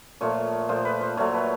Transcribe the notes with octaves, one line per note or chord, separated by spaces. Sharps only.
A#2 F3 A3 C#5
A#2 F3 A3 C5
B4
C5
A#2 F#3 A3 C#5
B4